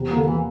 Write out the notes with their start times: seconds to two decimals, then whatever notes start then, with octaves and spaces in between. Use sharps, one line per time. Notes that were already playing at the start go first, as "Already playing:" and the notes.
Already playing: E2 C3
0.11 D3 A#3
0.26 E3 A#3